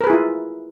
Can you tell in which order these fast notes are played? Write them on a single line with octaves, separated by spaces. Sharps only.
A#4 B4 G#4 E4 F4